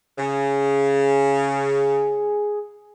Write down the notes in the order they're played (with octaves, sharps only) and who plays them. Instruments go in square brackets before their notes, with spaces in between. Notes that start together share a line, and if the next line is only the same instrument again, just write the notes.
[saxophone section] C#3 [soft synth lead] G#4